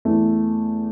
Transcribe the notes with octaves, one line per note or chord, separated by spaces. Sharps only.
E2 E3 A3